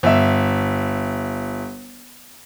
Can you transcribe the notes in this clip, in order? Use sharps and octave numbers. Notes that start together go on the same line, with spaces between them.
G1 E5